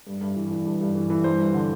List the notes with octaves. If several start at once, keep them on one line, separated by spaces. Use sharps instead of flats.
G2
G2
E3
E3
G2
G2
E3
E3
G2 C5
G2
D3